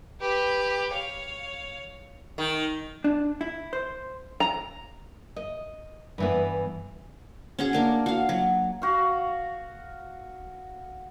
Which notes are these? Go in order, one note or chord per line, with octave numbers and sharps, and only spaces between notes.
G4 B4
C#5 F5
D#3
D4
E4
C5
A#5
D#5
G2 E3 B3
C#4 F#4 G#4
A#3 D4 A#4
F#4 F5
F#3
F#4 F5